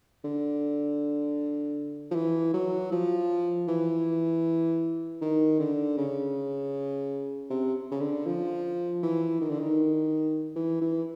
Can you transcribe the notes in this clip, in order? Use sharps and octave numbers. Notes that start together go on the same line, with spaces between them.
D3
F3
E3
F#3
F3
E3
D#3
D3
C#3
C3
C#3
D3
F3
E3
D#3
D3
D#3
E3
E3